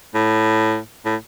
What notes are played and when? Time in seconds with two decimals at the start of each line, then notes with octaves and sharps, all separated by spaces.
0.15 A2
1.05 A2